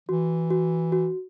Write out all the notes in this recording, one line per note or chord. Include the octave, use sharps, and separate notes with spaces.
E3 F#4
F#4
F#4